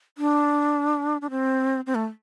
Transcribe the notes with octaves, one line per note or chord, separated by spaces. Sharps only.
D4
D4
C4
C4
A3